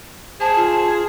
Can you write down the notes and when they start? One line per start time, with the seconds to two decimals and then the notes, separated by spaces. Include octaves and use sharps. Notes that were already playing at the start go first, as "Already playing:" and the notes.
0.41 G#4 C5 A5
0.56 F4